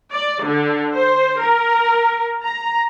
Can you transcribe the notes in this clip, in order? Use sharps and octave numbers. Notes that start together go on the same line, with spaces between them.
D5
D3
C5
A#4
A#5